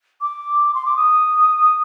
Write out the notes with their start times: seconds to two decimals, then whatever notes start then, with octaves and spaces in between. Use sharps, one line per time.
0.21 D6
0.74 C6
0.85 D6
0.96 D#6